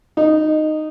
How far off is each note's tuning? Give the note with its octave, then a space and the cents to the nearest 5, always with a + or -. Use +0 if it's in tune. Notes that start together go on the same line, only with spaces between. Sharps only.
D#4 -10